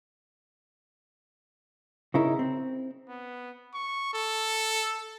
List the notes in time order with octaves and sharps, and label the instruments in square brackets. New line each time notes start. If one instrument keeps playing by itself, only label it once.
[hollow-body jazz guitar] C#3 D#4 E4 A#4
C4
[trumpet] B3
C#6
A4